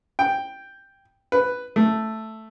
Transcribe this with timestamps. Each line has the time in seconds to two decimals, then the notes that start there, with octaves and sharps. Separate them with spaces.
0.19 G5
1.32 B4
1.76 A3